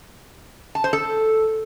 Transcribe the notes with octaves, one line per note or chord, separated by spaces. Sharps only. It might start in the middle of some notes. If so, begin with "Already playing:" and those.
A5
C5
A4